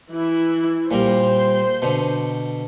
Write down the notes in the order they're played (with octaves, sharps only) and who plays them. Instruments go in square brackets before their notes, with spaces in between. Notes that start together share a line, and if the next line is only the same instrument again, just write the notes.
[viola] E3 E4
[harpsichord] A#2 G3 A#4 [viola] C5
[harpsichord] B2 D3